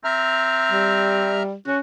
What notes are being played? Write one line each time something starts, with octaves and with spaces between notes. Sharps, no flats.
C4 E5 A#5 F6
G3
C#4 F#4